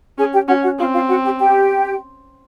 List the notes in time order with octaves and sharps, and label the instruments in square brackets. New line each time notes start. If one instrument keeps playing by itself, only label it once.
[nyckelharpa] C#4 [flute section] G#4 G#5
[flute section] G4 G5
[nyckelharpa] C#4 [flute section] F#4 F#5
[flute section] F#4 F#5
[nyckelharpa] C4 [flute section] F4 F5
[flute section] F4 F5
F#4 F#5
G4 G5
G4 G5